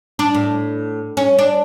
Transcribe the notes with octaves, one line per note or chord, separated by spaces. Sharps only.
D4
A2
C#4
D4